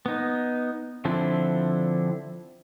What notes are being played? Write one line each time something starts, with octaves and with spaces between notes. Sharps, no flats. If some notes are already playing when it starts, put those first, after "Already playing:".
B3 D#4
D3 F3 C4 D4 E4